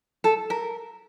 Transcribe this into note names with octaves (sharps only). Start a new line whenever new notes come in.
A4
A#4